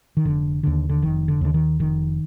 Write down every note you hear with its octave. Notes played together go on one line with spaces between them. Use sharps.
D#3
F1 D3
D#2 D3
D3
F1 D#3
D3
D#2 D3
D#3
F1 D#3